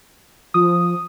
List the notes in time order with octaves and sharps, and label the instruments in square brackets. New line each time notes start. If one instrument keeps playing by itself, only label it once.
[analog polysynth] F3 [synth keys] D#6